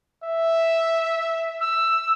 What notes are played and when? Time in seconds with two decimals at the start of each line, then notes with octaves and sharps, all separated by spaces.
0.24 E5
1.61 E6